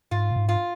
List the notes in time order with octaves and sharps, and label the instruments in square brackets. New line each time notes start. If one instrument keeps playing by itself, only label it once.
[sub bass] G#2 [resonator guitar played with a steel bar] F4
[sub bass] A#2
G#2
[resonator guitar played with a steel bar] F4